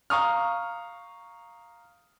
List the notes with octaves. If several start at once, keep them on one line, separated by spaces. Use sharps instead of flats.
F5 A#5 C#6 D#6 F6